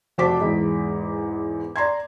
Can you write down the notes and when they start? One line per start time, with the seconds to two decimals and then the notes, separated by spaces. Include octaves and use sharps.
0.18 F1 F#4 C5 A5 D6 B6
0.40 E2 G#2
1.76 D5 A#5 C6 G#6